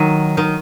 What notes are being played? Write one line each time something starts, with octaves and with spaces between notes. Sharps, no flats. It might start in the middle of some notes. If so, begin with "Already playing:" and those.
Already playing: D#3 F#3
D#3